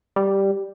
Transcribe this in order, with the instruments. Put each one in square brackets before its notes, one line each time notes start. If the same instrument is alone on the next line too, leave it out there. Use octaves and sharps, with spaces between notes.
[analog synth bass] G3